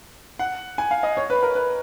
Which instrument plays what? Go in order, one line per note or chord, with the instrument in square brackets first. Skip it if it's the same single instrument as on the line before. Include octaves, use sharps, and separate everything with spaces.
[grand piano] F#5
G#5
F5
D#5
C#5
B4
A#4
B4